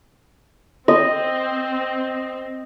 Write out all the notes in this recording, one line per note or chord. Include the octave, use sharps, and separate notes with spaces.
C4 D#5